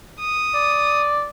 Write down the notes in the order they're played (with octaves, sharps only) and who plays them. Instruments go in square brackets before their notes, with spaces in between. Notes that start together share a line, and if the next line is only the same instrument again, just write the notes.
[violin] D#6
[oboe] D5